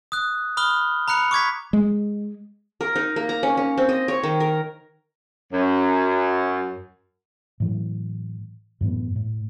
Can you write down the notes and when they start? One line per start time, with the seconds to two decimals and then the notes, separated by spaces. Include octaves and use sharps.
0.12 D#6 F#6
0.57 B5 D#6 F6 G7
1.08 A#5 B5 F#6 C#7 F7
1.31 C#6 D6 G#6 B6
1.73 G#3
2.81 A#4
2.96 D#4
3.16 A#3
3.29 A#5
3.43 C#4
3.57 C#4
3.78 C4
3.89 D#5
4.08 C#5
4.24 D#3
4.40 A#4
5.52 F#2
7.60 A2 E3 F#3
8.81 F#2 A2 E3 B3
9.16 A2